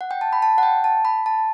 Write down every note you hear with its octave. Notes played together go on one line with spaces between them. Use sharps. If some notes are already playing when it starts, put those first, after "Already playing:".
F#5
G5
A5
B5
A5
F#5
G5
A5
B5
A5